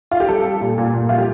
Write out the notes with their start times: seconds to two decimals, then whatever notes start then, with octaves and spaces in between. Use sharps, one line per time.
0.11 F4
0.20 G4
0.28 G3 A4
0.45 G3
0.61 A#2
0.78 A#2
0.94 A#2
1.09 G3 F4
1.18 G4